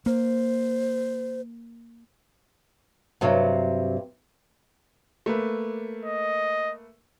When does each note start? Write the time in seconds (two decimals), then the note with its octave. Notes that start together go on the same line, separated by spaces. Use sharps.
0.06 A#3 C5
3.21 G2 C3 F#3
5.26 A3 A#3 B4
6.05 D#5